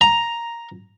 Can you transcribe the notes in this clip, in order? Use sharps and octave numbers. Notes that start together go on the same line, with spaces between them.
A#5